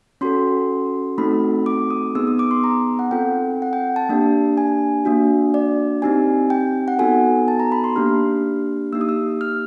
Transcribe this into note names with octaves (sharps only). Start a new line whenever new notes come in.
C#4 F#4 A4 C6
A3 C4 D#4 F#4 A4 B5
D6
D#6
B3 D#4 G#4 E6
D#6
D6
C6
A#5
F#5
C4 F4 A4 G5
F#5
G5
A5
A#3 D4 G4
G#5
A#3 D4 F#4
D5
C4 D#4 G4 G#5
G5
F#5
B3 D#4 F#4 A4 G#5
A5
A#5
B5
C6
A#3 D4 G4 F6
A#3 D#4 G4 E6
D#6
E6
F6